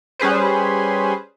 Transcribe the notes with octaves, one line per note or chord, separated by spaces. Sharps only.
G3 C#4 G#4 B4 C5